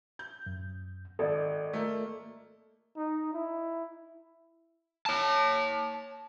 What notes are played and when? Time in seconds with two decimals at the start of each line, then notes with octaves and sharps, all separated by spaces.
0.19 G6
0.46 F#2
1.19 G#1 A4 D5 D#5
1.73 A3 A#3
2.97 D#4
3.34 E4
5.06 C#5 A5